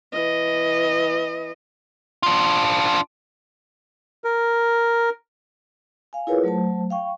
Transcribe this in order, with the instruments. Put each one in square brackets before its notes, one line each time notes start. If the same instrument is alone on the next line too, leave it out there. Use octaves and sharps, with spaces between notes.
[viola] E3 D#5
[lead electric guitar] D4 F4
[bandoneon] A#4
[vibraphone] F5 G#5
E4 F4 G#4 A#4 B4 C#5
F#3 A3 C5 A5
F5 G5 C#6